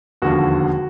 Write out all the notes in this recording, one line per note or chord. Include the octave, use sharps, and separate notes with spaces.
E1 D#2 D3 F3 F#4